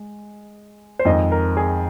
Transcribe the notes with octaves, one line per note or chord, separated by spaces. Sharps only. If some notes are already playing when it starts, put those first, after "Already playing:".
Already playing: G#3
C5
F2 D#3 G#3 D#5
A#4
G#4